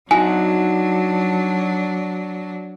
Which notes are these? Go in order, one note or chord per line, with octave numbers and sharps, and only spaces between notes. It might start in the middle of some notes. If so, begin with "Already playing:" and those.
F#3 D4 D#4 F#4 G#5